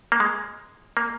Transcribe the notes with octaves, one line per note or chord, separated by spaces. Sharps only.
A#3
G#3
A#3